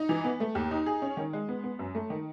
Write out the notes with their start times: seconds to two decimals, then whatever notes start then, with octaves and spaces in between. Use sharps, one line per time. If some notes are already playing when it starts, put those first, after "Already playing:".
Already playing: D#4
0.09 E3
0.24 B3
0.40 A3
0.55 D#2
0.71 D#4
0.86 G#4
1.02 C#4
1.17 D#3
1.33 G#3
1.49 B3
1.64 B3
1.79 F#2
1.95 A3
2.10 D#3